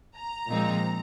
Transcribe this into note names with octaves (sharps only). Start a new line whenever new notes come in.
A#5
A#2 F3 G#3 C4 D#4